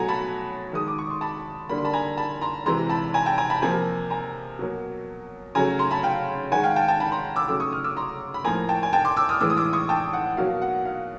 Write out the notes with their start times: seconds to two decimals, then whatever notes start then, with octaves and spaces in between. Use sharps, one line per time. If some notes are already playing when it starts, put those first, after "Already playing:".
Already playing: B2 F#3 A3 F#5 G#5 A#5
0.08 A5 B5
0.73 D#3 G#3 D#6
0.88 D6
0.98 C#6
1.10 C6
1.21 A5 B5
1.69 D3 G3 A#3 B5
1.78 C6
1.85 A5 B5
1.93 G#5 A#5
2.17 A5 B5
2.41 A#5 C6
2.66 C3 E3 G#3 A#5 C6
2.89 A5 B5
3.14 G#5 A#5
3.26 G5 A5
3.38 G#5 A#5
3.50 A5 B5
3.62 C3 F3 A#3 G#5 A#5
4.10 G#5 A#5
4.59 B2 F#3 A#3
5.55 C#3 F#3 A3 G#5 A#5
5.79 A#5 C6
5.91 A5 B5
6.03 F5 G5
6.52 D#3 G#3 F#5 G#5
6.63 F5 G5
6.76 G5 A5
6.88 G5 A5
7.00 A5 B5
7.12 A#5 C6
7.36 D6 E6
7.48 C#3 F#3 A3 D6 E6
7.60 C#6 D#6
7.72 D#6 F6
7.84 D6 E6
7.97 A#5 C6
8.34 B5
8.44 A2 F3 A#3 G#5 A#5
8.69 G5 A5
8.83 G#5
8.93 G5 A5
9.05 C6 D6
9.16 D6 E6
9.29 D#6 F6
9.40 A2 E3 G#3 D6 E6
9.50 D#6
9.57 D6 E6
9.73 C#6 D#6
9.89 G5 A5
10.13 F#5
10.37 B2 F#3 A#3 F5
10.62 F#5
10.85 F5